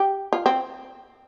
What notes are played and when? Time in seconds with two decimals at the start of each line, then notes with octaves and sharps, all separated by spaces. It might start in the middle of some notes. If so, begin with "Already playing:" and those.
Already playing: G4
0.33 F4
0.46 C4